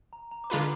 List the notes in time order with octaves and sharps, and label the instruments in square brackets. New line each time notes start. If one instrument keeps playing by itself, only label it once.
[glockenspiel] A#5
A#5
D6
[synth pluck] D3 G#3 D4 F4 B4 [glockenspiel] B5